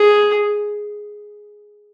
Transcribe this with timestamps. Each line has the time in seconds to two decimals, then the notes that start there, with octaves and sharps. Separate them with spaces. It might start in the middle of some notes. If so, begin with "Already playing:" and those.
Already playing: G#4